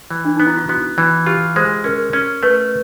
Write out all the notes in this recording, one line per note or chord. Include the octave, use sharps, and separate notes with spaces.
E3
D4
B3 D#4
E4
F4
B3 F#4
E3
F4 G4
G#3 C5
C#4 A#4
C#4
A3 B4